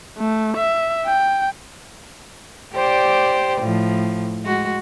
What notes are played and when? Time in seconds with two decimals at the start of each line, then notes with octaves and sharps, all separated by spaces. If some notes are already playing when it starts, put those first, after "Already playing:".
0.18 A3
0.57 E5
1.06 G5
2.73 G4 C5 D5
3.62 A2 F3
4.45 G#3 F#4